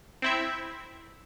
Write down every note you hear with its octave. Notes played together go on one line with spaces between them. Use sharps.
C4 E4 E5